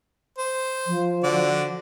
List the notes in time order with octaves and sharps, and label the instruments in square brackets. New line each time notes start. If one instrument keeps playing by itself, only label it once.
[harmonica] C5
[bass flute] F3
[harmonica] D3 F#4 D5